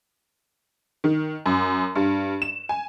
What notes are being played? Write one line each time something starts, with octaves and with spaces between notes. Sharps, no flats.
D#3
F#2
G2
E7
G#5